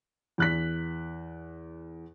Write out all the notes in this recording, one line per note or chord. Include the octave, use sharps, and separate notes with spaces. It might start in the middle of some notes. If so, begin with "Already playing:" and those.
E2 F#6 B6